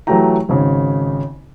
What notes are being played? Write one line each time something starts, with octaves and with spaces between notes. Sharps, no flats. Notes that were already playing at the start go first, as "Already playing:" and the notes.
E3 F#3 A3 G4 G5 A#5
G#1 C#3